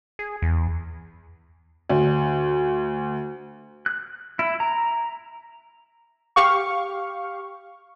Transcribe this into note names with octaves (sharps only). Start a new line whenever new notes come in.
G#4
E2
D2
F#6
E4
A#5
G4 F5 C#6